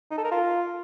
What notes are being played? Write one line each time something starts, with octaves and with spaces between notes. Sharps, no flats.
D#4
A4
A#4
F4